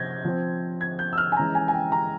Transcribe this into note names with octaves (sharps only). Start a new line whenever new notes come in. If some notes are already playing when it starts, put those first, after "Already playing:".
Already playing: C3 F3 C4 G6 G#6 A#6
F3 C4
G#6
G6
E6
F6
G#5
E3 G#3 C#4 A#5
G#5
G#5
G5
A#5